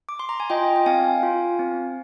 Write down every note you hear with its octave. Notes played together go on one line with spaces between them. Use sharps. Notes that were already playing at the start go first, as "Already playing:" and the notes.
D6
C6
A#5
G#5
F4 D#5 G5
G5
C4 F5 G#5
F4
C4